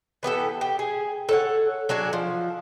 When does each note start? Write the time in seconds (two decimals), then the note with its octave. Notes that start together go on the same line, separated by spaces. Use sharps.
0.23 E3 B3 G4 A4
0.61 G4
0.79 G#4
1.29 A4 C#5 F#5
1.89 F#3 D4 F#4 G#4
2.13 F3